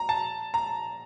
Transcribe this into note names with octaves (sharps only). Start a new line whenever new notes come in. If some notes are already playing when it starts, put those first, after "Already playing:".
Already playing: A#5
A5
A#5